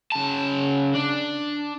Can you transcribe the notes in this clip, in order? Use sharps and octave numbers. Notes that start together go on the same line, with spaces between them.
C#3 A5
D4